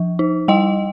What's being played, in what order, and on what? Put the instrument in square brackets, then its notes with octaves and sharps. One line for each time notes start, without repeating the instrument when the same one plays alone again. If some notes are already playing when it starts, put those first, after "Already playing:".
Already playing: [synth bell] F3
D#4
G3 D#5 G5